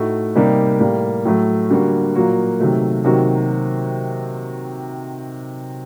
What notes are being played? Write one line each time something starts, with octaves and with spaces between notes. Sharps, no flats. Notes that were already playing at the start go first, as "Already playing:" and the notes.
Already playing: A2 A3 D#4 F#4
C3 G3 A#3 D#4 G4
A2 G3 A#3
A2 F#3 A3
D3 G3 A#3 F#4
A#2 F#3 A#3 F#4
C3 D#3 F#3 A3
C3 D#3 F#3 A#3 F#4